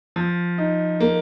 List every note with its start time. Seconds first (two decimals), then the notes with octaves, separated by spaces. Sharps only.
0.16 F3
0.58 D#4
1.00 A#3